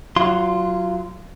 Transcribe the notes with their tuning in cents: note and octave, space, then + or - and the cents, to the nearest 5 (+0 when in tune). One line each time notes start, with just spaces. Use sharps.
F#3 +0 F4 -20 C6 +0